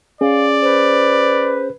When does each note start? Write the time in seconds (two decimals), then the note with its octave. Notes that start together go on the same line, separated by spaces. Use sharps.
0.21 C#4 G#4 D5 F5
0.61 B4 C5